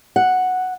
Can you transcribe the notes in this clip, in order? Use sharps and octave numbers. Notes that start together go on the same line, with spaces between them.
F#5